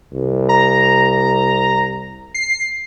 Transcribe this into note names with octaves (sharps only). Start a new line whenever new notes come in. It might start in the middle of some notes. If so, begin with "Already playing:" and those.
C2
A#5
C7